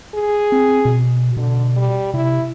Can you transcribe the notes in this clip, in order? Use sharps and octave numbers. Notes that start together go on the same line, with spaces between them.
G#4
C4
B2
B2 D3
G3
C3 E4